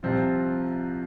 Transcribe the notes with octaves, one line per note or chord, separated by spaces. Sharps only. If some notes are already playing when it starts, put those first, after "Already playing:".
C2 C3 F3 C4 F4